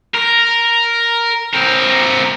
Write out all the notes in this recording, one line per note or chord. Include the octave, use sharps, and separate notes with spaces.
A#4
C4 A#4